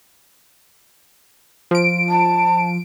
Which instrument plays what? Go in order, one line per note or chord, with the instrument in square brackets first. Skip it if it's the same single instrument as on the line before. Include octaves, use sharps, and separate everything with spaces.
[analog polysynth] F3 D7
[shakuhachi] A5